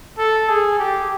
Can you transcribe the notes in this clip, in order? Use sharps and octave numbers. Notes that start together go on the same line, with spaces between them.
A4
G#4
G4